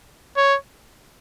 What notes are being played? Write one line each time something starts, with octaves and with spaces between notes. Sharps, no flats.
C#5